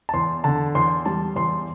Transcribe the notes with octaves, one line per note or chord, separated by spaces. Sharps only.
A5
E2 C6
D3 A5
E2 C6
G3 A5
E2 C6